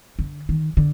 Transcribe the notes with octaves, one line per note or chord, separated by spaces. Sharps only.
D3
D#3
D3